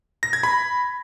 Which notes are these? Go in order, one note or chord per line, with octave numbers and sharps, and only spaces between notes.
A#6
G#6
B5